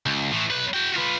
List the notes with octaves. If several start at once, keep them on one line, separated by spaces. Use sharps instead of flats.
C#2
A2 E3
B1 B4
F#4 G5
F4 B4